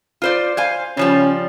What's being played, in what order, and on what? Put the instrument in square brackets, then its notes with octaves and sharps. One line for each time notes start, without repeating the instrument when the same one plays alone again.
[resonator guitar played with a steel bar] F4 C5 D5
C5 F5 G#5
[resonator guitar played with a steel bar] C#3 F3 G3 [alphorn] C#4